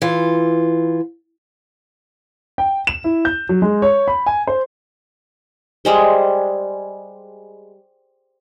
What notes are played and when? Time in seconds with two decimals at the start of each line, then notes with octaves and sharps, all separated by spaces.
0.02 E3 F4
2.58 G5
2.87 E7
3.04 E4
3.25 G6
3.49 F#3
3.62 G#3
3.82 C#5
4.08 B5
4.26 G#5
4.47 C5
5.85 G3 G#3 C5